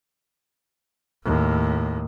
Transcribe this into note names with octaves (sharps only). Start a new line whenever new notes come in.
D#2 A2